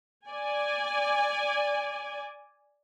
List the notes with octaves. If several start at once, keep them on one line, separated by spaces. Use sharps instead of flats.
D5 G#5